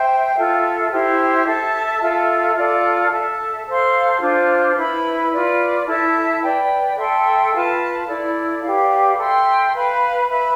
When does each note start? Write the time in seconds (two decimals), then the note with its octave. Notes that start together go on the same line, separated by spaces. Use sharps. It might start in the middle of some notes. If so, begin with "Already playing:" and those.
Already playing: C5 E5 G5
0.35 F4 A4 E5
0.90 E4 G4 C5
1.46 A4 E5 A5
2.00 F4 A4 E5
2.56 F4 A4 D5
3.10 A4 E5 A5
3.66 A4 C5 F5 C6
4.21 D4 F4 C5
4.76 E4 B4 E5 B5
5.31 F4 B4 D5
5.86 E4 A4 E5 A5
6.41 B4 D5 G5
6.96 A4 E5 G5 C6
7.52 F4 B4 F5 A5
8.06 E4 A4 D5
8.62 G4 B4 D5 F5
9.17 A4 E5 G5 C6
9.73 B4 F5 B5
10.27 B4 E5 B5